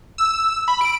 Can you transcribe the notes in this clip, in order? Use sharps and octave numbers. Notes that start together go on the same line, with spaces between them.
E6
B5
D7